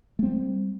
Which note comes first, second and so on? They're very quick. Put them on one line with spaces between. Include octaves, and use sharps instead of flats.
A3 C4 G3